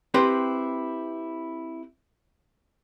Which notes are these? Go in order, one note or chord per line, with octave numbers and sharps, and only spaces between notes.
C4 E4 G4 B4 C5